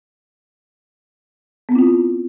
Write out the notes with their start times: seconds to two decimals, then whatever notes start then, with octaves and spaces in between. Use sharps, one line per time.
1.69 B3
1.72 C4
1.75 E4
1.79 F4